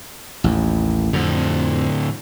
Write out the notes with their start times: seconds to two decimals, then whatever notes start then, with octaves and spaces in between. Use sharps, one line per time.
0.44 A1 D#2
1.13 F2 A2 D3